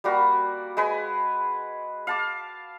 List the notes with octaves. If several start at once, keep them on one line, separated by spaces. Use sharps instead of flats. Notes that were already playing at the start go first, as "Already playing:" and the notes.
G3 A#3 F#4
G#3 B4 G#5
F5 A5 D6